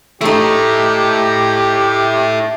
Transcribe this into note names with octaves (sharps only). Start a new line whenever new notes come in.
A3 D#4 E4 G4 A4